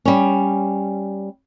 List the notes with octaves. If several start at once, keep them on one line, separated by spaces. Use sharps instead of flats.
G3 C#4